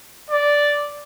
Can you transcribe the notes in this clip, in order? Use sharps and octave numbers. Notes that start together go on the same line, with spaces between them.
D5